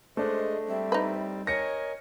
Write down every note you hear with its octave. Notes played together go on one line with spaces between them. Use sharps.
G#3 A3 D4 C5 D#5
G3 C4 E5
D#4 B4
A#4 C#5 D#5 G#5 A#6 C#7